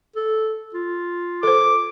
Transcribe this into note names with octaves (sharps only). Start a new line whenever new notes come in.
A4
F4
A4 C5 D6